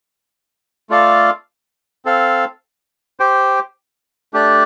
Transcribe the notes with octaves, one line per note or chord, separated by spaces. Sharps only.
A3 F4 A4 D5 F5
C4 A4 F5
G4 C5 G5
A3 D4 G4 D5